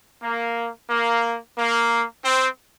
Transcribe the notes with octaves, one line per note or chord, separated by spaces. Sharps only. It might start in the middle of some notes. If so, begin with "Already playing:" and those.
A#3
A#3
A#3
C4